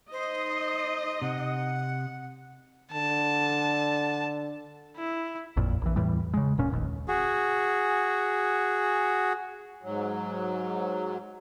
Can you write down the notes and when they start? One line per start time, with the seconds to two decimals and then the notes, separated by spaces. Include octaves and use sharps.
0.12 D#4 C5 D#5
1.22 C3 F#5
2.92 D3 A5
4.97 E4
5.57 A1 F2 A#2
5.82 A#1 E3
5.96 E2 A2 E3 G3
6.34 C#3 G#3
6.58 D1 A#2 C#4
6.70 F1 A#1 D#2
7.08 F#4 G#4
9.83 G#2 F#3